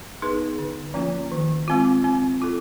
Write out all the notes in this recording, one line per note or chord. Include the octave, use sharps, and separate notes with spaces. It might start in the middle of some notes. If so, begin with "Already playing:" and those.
B3 D#4 G#4 B4
D3
F3 A#3 C#4 F4
D#3
G#3 C4 F4
C4
F4 A4